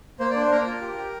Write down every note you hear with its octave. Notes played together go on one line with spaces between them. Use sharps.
A#3 C5
D4 D5
C5
A#3 A#4
F4
G4
G4